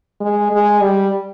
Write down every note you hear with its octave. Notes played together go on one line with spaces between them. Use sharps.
G#3
G#3
G3